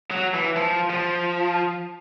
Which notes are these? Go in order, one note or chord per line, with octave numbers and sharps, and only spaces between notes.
F#3
E3
F3
F3